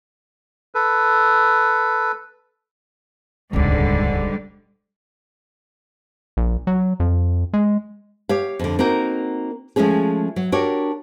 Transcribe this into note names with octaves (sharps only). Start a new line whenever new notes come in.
A4 B4
D#1 C#2 G#2 D3 G3
A#1
F#3
F2
G#3
G4 C#5 F5
F2 D3
A#3 C4 D#4 F#4 A#4
F3 G#3 A3 C#4 G#4
F#3
D4 F#4 G4 A#4 C#5